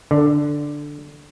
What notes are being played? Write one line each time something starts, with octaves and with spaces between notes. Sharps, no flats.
D3